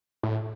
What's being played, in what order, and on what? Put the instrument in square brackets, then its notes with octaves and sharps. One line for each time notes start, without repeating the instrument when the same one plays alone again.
[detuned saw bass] A2